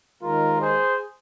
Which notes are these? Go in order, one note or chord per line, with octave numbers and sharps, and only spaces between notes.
D#2 D#3 G#3 F4 A#4
G#4 C5